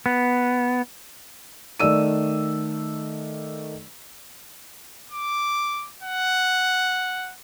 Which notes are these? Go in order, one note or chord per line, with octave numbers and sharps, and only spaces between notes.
B3
D#3 A3 D5 E6 D#7
D6
F#5